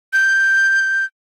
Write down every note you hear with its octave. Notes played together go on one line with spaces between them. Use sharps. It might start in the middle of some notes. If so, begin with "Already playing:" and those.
G6